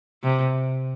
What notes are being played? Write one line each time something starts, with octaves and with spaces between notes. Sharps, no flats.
C3